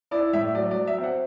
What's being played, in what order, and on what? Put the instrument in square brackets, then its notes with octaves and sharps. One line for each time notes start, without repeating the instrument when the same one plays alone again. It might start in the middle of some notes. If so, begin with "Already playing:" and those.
[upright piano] E4 D5
A2 E5
F#3 D5
D5
F#3
E5
C4
F#5